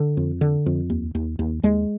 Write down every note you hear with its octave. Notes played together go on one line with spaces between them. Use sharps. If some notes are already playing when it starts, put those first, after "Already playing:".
Already playing: D3
F2
D3
F2
D#2
D#2
D#2
D#2 G#3